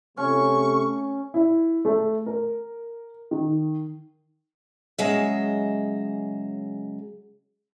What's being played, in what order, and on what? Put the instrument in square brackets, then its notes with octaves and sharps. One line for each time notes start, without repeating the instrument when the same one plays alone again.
[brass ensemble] C3 A3 [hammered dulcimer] C#4 [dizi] C#6
[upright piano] E4
A3
A#4
D#3
[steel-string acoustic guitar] C#3 F#3 G#3 G#4 D#5 E5